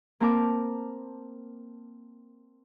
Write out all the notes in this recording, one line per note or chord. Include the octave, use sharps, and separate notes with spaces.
A#3 C4 A#4 A5 B5 D6